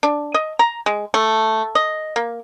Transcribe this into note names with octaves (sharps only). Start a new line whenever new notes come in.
D4
D#5
A#5
G#3
A3
D#5
A#3